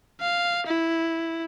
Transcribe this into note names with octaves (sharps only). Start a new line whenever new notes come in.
F5
E4